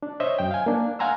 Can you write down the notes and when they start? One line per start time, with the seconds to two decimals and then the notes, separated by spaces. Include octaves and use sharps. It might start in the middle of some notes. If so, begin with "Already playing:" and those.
0.03 D4
0.20 C5 C#5 D#5 E5
0.39 F#2 G5
0.51 F5 G#5
0.66 A#3 D4
0.99 F5 F#5 G#5 A#5 C6 E6